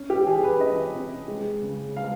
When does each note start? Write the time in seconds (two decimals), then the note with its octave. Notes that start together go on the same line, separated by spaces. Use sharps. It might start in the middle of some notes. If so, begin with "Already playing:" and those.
Already playing: C#4
0.10 G4
0.26 E3 G#4
0.44 B4
0.60 C#4 D#5
0.95 C3
1.28 G#3
1.62 C#3
1.96 G#3 F5